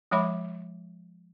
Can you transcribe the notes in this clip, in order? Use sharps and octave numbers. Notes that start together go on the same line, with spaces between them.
F3 G#3 C#5 E5 B5 D6